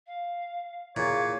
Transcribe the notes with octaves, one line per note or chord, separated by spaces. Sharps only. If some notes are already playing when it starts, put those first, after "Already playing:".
F5
A#2 E4 G#4 C#5 F5